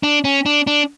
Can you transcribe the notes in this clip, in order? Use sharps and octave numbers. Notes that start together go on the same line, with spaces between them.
D4
C#4
D4
D4